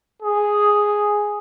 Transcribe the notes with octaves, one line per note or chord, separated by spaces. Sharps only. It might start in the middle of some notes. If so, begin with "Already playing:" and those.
G#4